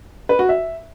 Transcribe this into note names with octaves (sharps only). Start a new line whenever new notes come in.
B4
F#4
E5